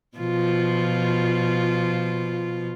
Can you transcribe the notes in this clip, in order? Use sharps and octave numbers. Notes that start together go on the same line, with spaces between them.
B2 F3 F4